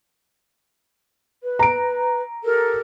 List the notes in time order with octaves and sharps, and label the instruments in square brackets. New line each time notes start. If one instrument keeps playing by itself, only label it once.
[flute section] B4
[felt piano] A#5 D7
[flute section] G4 A4 A#4